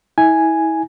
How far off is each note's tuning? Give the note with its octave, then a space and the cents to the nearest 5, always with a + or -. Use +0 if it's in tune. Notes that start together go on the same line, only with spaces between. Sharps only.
E4 -30 G#5 +0